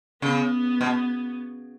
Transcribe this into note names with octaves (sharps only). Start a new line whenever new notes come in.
C#3 B3
B2